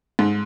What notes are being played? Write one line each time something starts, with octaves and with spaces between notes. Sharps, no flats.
G#2